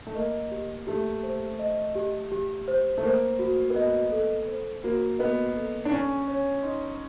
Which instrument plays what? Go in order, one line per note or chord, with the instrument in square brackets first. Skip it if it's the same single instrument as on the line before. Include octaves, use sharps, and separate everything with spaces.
[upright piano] A3
[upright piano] A#3 [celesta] D#5
[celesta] G4
[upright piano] A3 [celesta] G4
[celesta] C5
D#5
G4
G4
C5
[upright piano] A3
[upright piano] A#3 [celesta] C5
[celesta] F#4
[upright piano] B3
[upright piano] A#3 [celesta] D#5
[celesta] A4
C5
[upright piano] A#3 [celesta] F#4
[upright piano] B3 [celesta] D#5
[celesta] A4
[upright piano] D4
[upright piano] C#4 [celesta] G#5
[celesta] C#5
[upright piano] D#4 [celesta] C6